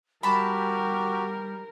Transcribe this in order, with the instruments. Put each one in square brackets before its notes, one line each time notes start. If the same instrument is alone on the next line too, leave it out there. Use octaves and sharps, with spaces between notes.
[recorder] G3 [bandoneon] F#4 G4 [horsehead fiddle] A#4 [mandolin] A5 B5